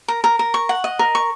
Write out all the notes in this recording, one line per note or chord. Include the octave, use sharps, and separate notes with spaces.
A#4
A#4
A#4
C#6
F#5
D#5
A#4
C#6